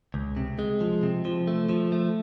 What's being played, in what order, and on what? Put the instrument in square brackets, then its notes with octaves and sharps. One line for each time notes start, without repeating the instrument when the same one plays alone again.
[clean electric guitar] C#2
C3
G#3
F3
C3
F3
A3
F3
A3